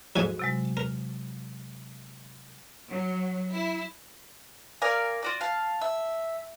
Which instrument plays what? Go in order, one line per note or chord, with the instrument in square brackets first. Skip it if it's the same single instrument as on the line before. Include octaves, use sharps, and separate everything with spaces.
[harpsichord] F2 G#2 G#5 [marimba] F#4
[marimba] C3 F#3 G#3
[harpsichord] A#4
[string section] F#3
E4
[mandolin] A#4 D5 F5 G#5
F4 F#4 D5
F5 A5
E5